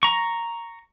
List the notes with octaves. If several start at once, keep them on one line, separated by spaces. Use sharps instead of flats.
A#5 C#6